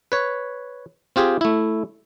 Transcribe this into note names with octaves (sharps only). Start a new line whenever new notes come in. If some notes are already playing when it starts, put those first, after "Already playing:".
B4 C#5
C4 F4 G4 G#4
A3 E4